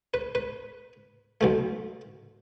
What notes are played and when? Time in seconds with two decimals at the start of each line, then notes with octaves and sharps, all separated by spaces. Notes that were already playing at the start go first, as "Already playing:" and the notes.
0.14 B4
0.35 B4
1.41 B1 B2 A3